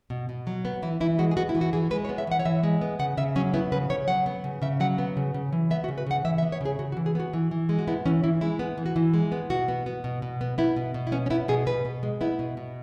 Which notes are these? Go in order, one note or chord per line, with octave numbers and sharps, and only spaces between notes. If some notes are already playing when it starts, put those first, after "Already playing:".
B2
B2
F#3
B3
E3 E4
E3 E4
G#3 F#4
G#4
B3 F#4
E4
E3
F#4
E3 G#4
G#3 B4
C#5
B3
E5
E3 F#5
C#5
E3 E5
G#3
B3
C#3 F#5
C#3 E5
F#3 C#4
B3 E4
C#3 B4
C#3 C#5
F#3 F#5
B3
C#3
C#3 E5
F#3 F#5
B3
C#3
C#3
E3
B3 E5
F#4
C#3
B4
C#3 F#5
E3 E5
E5
B3
C#5
C#3 G#4
C#3 F#4
F#4
E3
G#4
B3 F#4
E3
E3
G#3
F#4
B3 E4
E3 C#4
E3 E4
G#3 E4
B3
E3
F#4
E3 E4
G#3
B3
B2 F#4
B3
B3
B2
B2
B3
B3 E4
B2
B2
E4
B3 C#4
C#4
B3 E4
B2 G#4
B2 B4
B2
G#3
B3 E4
B2
B2